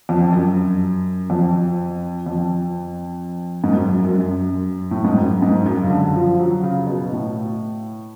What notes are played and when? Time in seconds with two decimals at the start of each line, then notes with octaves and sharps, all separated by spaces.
0.09 F2
0.32 F#2
1.30 F2
2.26 F2
3.64 G#2
3.72 F#2
3.89 F#2
4.05 F#2
4.20 F#2
4.91 A2
5.04 G#2
5.18 F#2
5.42 G#2
5.66 F#2
5.83 C#3
5.90 D3
6.15 F3
6.40 F#3
6.63 C#3
6.87 B2
7.12 A2